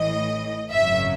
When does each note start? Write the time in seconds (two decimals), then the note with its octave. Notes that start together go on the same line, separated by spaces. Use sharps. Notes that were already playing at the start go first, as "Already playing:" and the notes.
Already playing: A1 A2 E3 D#5
0.71 G#1 F#2 C#3 F#3 E5